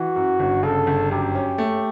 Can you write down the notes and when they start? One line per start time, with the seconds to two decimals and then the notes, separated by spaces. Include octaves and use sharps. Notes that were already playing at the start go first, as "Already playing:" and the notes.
Already playing: E3 F#4
0.16 F#2
0.40 G1
0.63 C#3 A4
0.87 G1
1.11 F#2 G4
1.35 C#4
1.58 A3